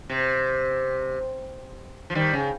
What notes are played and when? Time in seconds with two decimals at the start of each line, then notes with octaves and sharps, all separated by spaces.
0.10 C3
2.10 F3
2.15 D#3 G3
2.33 C#3